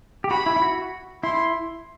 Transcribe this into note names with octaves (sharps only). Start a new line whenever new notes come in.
G4
F#4 B5
E4
E4
F#4
E4 C6